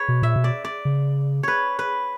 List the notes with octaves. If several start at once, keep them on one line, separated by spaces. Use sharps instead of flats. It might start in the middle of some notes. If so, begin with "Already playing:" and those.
Already playing: B4 C#5
B2
A#2 E5
B2
D5
D5
C#3
B4 C#5
B4